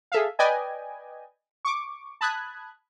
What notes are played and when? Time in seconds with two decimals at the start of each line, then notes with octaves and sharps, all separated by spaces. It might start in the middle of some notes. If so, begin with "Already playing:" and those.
0.12 G#4 A4 E5 F5
0.39 B4 D5 D#5 G5 G#5
1.65 C#6 D6
2.21 A5 B5 D#6 F#6 G#6